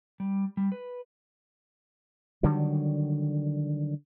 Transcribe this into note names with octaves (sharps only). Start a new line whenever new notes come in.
G3
G3
B4
D3 D#3 F#3 G3